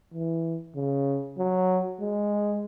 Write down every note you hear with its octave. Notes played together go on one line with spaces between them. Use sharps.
E3
C#3
F#3
G#3